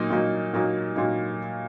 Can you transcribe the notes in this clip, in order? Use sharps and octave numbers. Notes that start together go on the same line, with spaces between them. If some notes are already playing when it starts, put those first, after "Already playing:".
Already playing: A#2 F#3 A#3 D#4
A#2 F#3 A#3 D#4
A#2 F#3 A#3 D#4
A#2 F#3 A#3 D#4